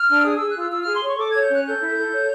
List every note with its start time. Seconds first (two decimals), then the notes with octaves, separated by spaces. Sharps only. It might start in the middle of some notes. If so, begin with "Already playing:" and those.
Already playing: F6
0.09 D4
0.18 E6
0.24 G#4 D#6
0.37 G#4 E6
0.49 F#6
0.56 F4 E6
0.72 F4 E6
0.83 G#4 F6
0.95 C6
1.03 C#5 C#6
1.19 A4 D6
1.30 C#5 G#6
1.42 G6
1.50 C#4 F#6
1.66 A4 G6
1.81 E4
1.97 A4
2.13 C#5